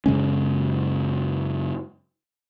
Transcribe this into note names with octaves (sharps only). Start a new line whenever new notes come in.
F#2 C#3 G#3 C#4